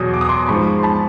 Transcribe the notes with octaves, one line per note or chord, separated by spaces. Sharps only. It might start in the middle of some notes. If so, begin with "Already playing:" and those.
Already playing: E2 B2 F#3 D#6
D6
D#6
C6 D6
G#2 F3 B5 C#6
C6
A5 B5